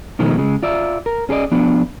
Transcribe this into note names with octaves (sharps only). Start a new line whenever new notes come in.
B2 D#3 F3 G#3 A3
C#3 G#3
F4 D5 E5
A#4
C#4 G#4 A#4 D5 D#5
F3 B3 D4